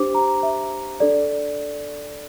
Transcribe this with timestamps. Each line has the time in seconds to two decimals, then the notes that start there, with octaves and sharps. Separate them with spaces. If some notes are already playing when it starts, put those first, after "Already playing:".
Already playing: D4 G4 C5 D6
0.15 A#5
0.43 E5
1.00 D4 A4 D5